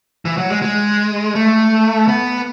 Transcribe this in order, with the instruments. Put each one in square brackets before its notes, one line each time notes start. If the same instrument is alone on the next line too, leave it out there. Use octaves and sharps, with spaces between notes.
[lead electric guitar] E3
F#3
G#3
G#3
A3
B3